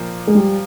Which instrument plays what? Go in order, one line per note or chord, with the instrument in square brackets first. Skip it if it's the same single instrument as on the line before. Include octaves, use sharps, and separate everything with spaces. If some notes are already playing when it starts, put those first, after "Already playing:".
Already playing: [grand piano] A#2 F3 A#3
[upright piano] G#3
G3